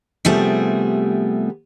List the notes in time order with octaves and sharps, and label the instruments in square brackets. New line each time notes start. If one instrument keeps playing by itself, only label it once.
[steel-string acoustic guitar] C3 F3 G3 A3 B3 G#4